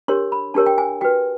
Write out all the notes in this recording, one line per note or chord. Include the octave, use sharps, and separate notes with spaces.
D4 G4 A#4 C#5 C6
B5
D4 G4 A#4 C#5 A5
G5
G#5
F#4 B4 G5